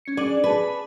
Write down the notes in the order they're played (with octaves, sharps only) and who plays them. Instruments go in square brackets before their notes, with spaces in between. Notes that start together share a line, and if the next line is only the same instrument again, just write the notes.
[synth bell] C#4 C#7
[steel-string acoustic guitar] D4 [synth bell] G#4 D6 F#7
[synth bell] G#4 A5 [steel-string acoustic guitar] B4